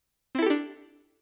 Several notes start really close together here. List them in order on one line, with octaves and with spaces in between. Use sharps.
C4 E4 A4 G4 D4